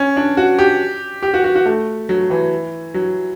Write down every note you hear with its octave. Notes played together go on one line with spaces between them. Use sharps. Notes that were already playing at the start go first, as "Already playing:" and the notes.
Already playing: C#4
D4
F#4
G4
G4
F#4
F#4
F#4
A3
F#3
E3
F#3